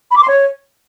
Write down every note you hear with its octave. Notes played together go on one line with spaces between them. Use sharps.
B5
D6
C6
C#5